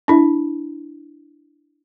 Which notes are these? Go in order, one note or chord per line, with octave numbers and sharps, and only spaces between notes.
D4 E4